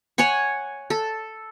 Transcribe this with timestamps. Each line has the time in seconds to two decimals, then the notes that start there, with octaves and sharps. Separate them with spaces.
0.18 C#5 F#5 G#5 C#6
0.90 A4